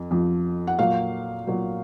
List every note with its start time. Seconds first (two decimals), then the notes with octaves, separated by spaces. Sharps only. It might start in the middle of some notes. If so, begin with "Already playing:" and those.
Already playing: F2
0.11 F2 F3
0.67 F#5
0.79 A#2 F#3 F5
1.47 A#2 F#3